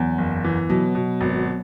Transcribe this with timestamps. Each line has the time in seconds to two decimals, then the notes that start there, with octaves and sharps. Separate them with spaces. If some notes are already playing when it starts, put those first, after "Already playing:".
Already playing: E2 F#3 B3
0.18 F#1
0.44 E3
0.69 B2 F#3 B3
0.95 B2
1.21 G#1